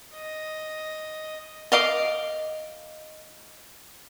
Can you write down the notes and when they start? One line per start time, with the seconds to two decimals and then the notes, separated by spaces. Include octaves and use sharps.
0.15 D#5
1.72 D#5 F5 D6